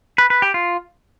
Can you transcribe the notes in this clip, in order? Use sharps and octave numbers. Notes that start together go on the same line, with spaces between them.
B4
B4
G4
F4